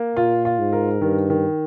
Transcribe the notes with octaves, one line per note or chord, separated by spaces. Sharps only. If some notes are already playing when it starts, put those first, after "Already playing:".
Already playing: A#3
A#2 F4
F4
G#2
A#4
G2 D#3
D#3